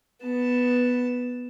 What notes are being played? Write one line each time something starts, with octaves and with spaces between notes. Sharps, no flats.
B3 A5